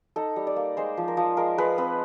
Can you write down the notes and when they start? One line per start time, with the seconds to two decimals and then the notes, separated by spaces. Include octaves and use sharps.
0.16 D#4 A4
0.36 G3
0.47 D5
0.56 A#3
0.77 G#3 C5
0.97 F3
1.08 A#4
1.17 F3
1.37 G#3 A#4
1.58 G#3 B4
1.78 C4 B4